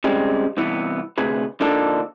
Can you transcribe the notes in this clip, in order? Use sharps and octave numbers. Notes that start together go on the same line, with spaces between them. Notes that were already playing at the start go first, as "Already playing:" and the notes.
C#3 G3 G#3 C4
C2 E3 B3
D2 C3 G#4 B4
D3 F3 A#3 D4 D#4 A4